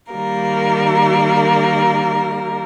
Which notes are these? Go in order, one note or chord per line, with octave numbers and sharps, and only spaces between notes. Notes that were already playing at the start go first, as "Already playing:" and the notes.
D#3 G3 A#3 A#4